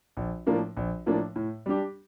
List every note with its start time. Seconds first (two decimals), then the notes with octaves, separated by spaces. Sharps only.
0.17 A#1
0.47 A2 F3 A#3 D4
0.77 A#1
1.06 A2 F3 A#3 D4
1.36 A2
1.66 G3 D4 G4